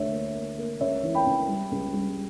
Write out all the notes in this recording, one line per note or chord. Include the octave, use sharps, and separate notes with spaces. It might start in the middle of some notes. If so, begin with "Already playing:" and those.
Already playing: D2 C#5 E5
A#3
A#3
A#3
C#2 C#5 E5
E3
G5 B5
C#2
G3
C#2
G3